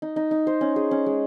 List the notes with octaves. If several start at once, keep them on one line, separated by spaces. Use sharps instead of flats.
D#4
D#4
D#4
C5
C#4
G#4
C#4
G#3